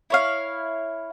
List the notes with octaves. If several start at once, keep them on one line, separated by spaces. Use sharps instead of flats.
E4 C#5 F5